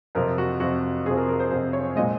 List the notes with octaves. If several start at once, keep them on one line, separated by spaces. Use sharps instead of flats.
F2 C3 F3 A#4
F#4
F2 C3 F3 F#4
F2 C3 F3 G#4
A#4
A#4
C5
F2 C3 F3 C5
C#5
A#2 F3 G#3 D#5